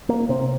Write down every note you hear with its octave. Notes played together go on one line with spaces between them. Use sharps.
A#3
C3 C4